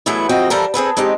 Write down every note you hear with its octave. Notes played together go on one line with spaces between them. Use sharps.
E3 F#3 G#3 A3 B3 E4
F2 F3 C4 F#4 D#5 G5
E3 F3 G3 A4 A#4
C4 G#4 A4 B4
G#3 C4 D#4 G4